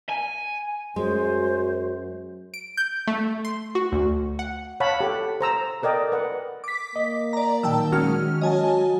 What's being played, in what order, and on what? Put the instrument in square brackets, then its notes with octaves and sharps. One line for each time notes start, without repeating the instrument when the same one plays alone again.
[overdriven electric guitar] G#5
[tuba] F#2 [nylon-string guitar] G#3 [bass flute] F#4 [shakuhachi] C5
[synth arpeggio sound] D7
G6
A3
C6
F#4
D2
F#5
[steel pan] C#5 F5 F#5 A5 B5
G4 A4 F#5
C5 A#5 E6
A4 A#4 D5 D#5 G5
B4 F#5
[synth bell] D6 B6
[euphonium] A#3 [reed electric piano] D#5
[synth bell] D5 A#5
[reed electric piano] A#2 D#3 F#3 [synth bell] G5 A5 E6
[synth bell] D#3 C#4 F6 [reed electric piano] G#3 F#4
[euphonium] F#3 [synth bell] D#5 G#5 A5